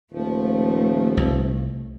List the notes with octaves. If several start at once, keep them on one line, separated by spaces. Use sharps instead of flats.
D#1 F3 A3
C2